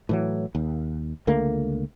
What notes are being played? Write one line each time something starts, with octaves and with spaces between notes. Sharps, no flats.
A2 E3 F#3
D#2
C#2 D3 A3 A#3